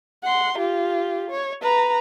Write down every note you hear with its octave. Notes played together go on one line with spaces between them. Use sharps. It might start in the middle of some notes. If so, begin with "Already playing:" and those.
F#5 C6
F4 G4
C#5
B4 A#5